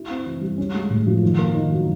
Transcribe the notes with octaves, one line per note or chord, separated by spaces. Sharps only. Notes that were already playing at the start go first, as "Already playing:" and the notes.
Already playing: E4
C4
E3
G3
C#4
G#3
A2
F3
D#3
A#3
D#3
F#3